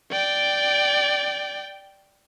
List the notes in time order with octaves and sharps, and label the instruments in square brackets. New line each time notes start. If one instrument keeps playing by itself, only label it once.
[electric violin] D5 G5